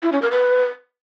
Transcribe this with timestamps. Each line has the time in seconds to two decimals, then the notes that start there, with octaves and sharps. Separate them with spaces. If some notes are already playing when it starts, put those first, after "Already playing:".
0.03 E4
0.12 C#4
0.22 A#4
0.31 B4